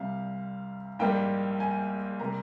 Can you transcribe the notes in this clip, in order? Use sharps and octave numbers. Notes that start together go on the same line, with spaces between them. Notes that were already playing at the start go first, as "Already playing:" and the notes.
Already playing: C2 C3 G3 F5
A#1 G#2 G3 A#3 G5
G#5
C3 G3 A#3 A#5